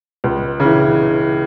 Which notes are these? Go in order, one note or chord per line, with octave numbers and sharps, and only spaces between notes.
C#2
C#3
E3